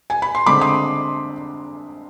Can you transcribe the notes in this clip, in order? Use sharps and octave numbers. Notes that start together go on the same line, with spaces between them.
G#5
B5
C6
D3 G#3 C4 B5 D6
C6 D#6